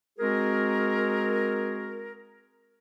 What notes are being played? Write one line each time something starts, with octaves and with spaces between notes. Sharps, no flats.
G#3 C4 F#4 G#4 A#4